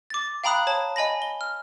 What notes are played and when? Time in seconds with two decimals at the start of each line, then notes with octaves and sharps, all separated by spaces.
0.10 D6 A6
0.44 F5 G5 A#5 B5 D#6 F#6
0.67 C#5 A5
0.96 D#5 G#5 B5 A#6
1.22 G7
1.41 F6